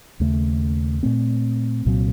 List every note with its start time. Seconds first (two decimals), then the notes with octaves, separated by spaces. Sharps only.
0.20 D#2 C#3 A3
1.03 A#2 A3 C4
1.86 C2 A#2 F#3 C4